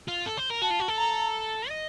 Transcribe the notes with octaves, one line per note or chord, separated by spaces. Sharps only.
F4
A4
C5
A#4
F#4 A5
F4
F#4
A4
A#5
D#5